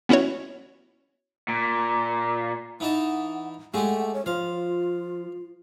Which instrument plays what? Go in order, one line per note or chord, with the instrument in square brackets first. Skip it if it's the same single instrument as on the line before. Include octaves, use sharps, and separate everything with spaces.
[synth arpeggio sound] B3 C#4 E4 F#4 C#5
[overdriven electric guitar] A#2
[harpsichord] E3 D#4 A5 [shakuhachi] F#5
[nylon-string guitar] G#3 G#4 [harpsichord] A3 G4 [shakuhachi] F#5
[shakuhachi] C#5
[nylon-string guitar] F3 [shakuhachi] F4 [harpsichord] F5